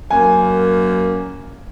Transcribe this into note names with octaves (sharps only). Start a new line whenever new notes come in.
F#2 A#3 G#5